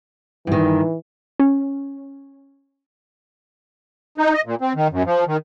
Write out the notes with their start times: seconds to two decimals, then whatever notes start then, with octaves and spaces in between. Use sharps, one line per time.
0.47 G2 D#3 E3
1.40 C#4
4.18 D#4
4.34 D#5
4.46 A#2
4.61 C4
4.76 D#3
4.92 F#2
5.06 F3
5.27 D#3